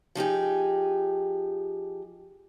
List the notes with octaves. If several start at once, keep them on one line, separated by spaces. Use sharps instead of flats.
F3 D#4 G4 G#4